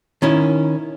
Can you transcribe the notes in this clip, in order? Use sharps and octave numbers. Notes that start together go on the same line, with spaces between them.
D#3 C#4 E4